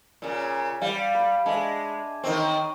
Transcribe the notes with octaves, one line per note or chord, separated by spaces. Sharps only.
A#2 C#3
G3 F5 F#5 G#5
B5
G#3 D4 D#5 E5
D#3 C4 C#5 D#5 G5